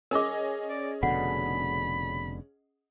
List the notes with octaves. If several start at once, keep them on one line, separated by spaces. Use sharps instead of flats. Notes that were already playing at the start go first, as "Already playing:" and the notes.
C#4 G#4 A#4 D#5 D6
D5
F1 B2 D3 F#5 B5